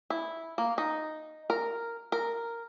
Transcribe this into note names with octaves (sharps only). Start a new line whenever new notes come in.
E4
A#3
D#4
A#4
A#4